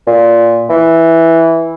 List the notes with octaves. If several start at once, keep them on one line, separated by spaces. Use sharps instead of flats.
A#2
E3